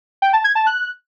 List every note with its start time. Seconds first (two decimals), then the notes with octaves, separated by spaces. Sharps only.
0.22 G5
0.33 A5
0.44 G#6
0.55 A5
0.66 F#6